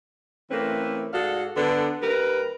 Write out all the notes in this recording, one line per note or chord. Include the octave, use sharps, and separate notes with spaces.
E3 A3 A#3 C4 C#4 B4
G#2 F#4 G#4 A4 D5 F5
D3 B3 D4
D#2 G3 A#4 B4